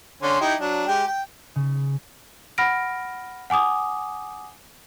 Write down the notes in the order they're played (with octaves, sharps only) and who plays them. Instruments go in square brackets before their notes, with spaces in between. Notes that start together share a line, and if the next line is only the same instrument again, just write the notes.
[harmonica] D3 C#4 C6
D#4 E4 G4
F#3 D4
G#3 G4
G5
[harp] C#3
[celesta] F#5 B5 F6 A#6 D7
F#5 G#5 D6 D#6